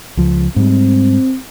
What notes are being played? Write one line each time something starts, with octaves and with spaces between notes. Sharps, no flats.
C#2 F3
G#2 G3 C4